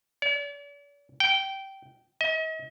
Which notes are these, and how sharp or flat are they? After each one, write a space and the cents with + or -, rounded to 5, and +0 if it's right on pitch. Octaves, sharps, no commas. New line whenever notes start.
D5 -45
G5 -15
D#5 +40